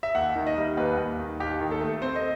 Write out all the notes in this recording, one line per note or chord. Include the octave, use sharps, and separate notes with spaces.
E5
D#2 F#5
D#3
D#5
G3
D#2 B4
D#2
D#3
D#2 G4
D#3
A4
A3
C4 C5
D#5